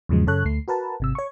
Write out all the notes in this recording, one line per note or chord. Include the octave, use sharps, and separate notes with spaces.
E2 G#2 C#3 F3 F#3 G#3
F#2 C#3 A4 C#5 F#6
D2 A3 C7
F#4 A#4 B4 A5
G#1 C3 E6
C#5 C#6